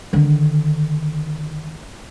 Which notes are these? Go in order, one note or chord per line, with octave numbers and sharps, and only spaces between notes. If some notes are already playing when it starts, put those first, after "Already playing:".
D3 D#3